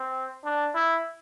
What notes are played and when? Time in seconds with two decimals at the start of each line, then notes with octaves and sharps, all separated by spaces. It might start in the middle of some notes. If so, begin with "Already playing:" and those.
Already playing: C4
0.44 D4
0.75 E4